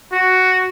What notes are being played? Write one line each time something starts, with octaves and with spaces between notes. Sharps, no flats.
F#4